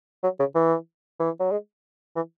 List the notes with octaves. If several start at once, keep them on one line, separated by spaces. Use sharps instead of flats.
F#3
C#3
E3
E3
F#3
G#3
E3